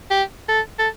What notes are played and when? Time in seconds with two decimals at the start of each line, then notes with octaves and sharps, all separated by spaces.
0.11 G4
0.49 A4
0.79 A4